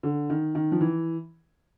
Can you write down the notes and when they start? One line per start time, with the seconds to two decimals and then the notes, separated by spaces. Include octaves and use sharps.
0.03 D3
0.30 D#3
0.55 D#3
0.72 F3
0.81 E3